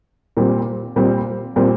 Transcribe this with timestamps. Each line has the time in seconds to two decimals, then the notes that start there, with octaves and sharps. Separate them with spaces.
0.37 A#2 G3 C4
0.96 A#2 G3 C4
1.56 A#2 G3 C4